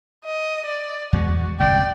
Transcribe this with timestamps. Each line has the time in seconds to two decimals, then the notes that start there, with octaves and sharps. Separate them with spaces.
0.25 D#5
0.65 D5
1.13 E2 G#3 F#4
1.60 G1 C2 F#2 D5 G5